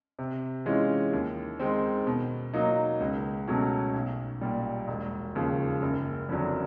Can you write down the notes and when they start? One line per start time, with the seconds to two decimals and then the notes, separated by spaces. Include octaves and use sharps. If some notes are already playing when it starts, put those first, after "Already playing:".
0.19 C3
0.66 E3 G#3 C#4 F4
1.13 D#2
1.60 D#3 G#3 C4
2.07 B2
2.54 F#3 A#3 D#4
3.00 C#2
3.48 B2 F#3 A3 C#4
3.94 B1
4.41 A#2 G3
4.88 E1
5.35 D#2 C#3 F3
5.82 F#1
6.29 F2 D3 F#3